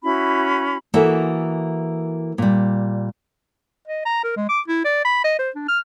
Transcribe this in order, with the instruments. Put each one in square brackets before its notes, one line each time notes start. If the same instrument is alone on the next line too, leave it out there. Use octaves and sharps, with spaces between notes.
[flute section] C#4 E4 F#4 B5
[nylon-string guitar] E3 A#3 F#4 G#4 A4 E5
A#2 G3
[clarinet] D#5
A#5
A#4
G#3
D6
E4
D5
B5
D#5
C5
D4
F6